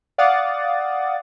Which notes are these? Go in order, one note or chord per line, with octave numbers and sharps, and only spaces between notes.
D5 F5 F#5 D6 D#6 A6